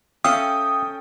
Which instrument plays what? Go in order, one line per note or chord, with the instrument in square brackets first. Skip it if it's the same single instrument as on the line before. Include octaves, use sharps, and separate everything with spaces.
[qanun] C#4 A4 [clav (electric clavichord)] E5 F5 [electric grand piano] G5 [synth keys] D#6